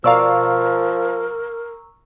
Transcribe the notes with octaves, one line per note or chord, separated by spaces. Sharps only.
B2 F3 A#4 D5 F5 A#5 C#6 E6